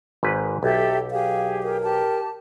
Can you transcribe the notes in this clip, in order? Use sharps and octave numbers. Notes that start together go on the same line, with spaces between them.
G#1 G#2 B4
B1 G4 A4 E5
G4 G#4 F5
A#4
G4 A5